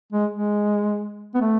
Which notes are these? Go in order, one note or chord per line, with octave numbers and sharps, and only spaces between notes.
G#3
G#3
B3
A3